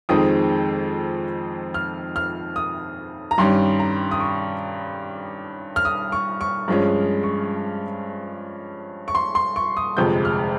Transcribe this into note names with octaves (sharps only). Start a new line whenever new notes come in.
F2 D#3 G#3 C4 D#6
F6
F6
D#6
A#5
G2 D#3 G3 C#4 C6
A#5
D#6
C#6
F6
D#6
C#6
C#6
G2 F3 G#3 C#4
C#6
C#6
C6
C6
C#6
D#6
G1 F2 C3 F3 G#3 G6
F6